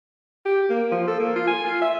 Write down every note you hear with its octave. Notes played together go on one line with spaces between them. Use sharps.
G4
A#3
F3
A4
A#3
F4
G#5
F4
E5